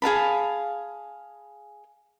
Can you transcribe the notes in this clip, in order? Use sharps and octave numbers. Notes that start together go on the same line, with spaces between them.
G#4 F5 A5 B5